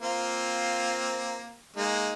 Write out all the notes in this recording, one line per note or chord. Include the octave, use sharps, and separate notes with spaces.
A#3 C4 F4
G#3 A#3 D#4